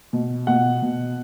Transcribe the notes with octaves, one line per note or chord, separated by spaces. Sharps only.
B2
B2 F#5
B2